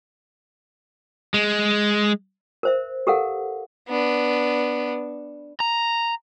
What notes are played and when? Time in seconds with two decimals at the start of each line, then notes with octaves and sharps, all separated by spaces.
1.34 G#3
2.63 A#4 C5 E5
3.07 G4 A4 A#4 F5 F#5
3.89 B3 D4
5.60 A#5